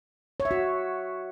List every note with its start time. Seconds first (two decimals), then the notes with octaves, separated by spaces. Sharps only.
0.40 C#5
0.45 E5
0.51 F#4